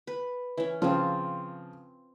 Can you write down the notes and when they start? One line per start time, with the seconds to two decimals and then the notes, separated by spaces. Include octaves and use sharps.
0.07 B4
0.57 E3 C#4
0.82 C#3 F3 C4 F4